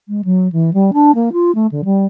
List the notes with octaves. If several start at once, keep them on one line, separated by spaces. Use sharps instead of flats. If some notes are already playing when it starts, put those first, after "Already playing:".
G#3
F#3
E3
G3
D4
A#3
F4
A3
D3
G3